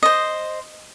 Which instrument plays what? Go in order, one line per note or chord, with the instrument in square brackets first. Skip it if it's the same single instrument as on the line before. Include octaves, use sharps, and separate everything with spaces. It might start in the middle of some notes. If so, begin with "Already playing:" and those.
[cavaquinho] C5 D#5